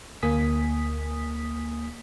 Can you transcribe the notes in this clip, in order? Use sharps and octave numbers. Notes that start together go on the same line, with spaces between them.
D2 A#3 G#5 D#6 B6